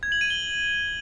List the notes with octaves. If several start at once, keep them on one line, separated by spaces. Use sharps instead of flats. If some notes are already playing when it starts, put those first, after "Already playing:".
G#6
F#7
D#7
G7